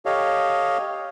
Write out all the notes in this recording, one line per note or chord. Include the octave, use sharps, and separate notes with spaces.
G4 A4 C#5 D#5 F5